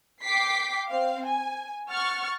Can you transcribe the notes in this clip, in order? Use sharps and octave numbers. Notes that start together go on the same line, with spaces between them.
G5 D6 B6 C7
C4 F5
G#5
F#5 C#6 F6 A6